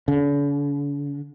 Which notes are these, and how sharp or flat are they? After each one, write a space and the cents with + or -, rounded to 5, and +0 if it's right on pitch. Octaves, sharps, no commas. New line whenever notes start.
D3 -45